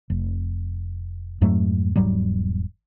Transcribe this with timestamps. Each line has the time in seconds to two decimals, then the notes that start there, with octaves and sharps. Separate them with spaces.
0.10 F1
1.41 F2 G#2 F#3 A3
1.96 E1 G#2 F#3 G3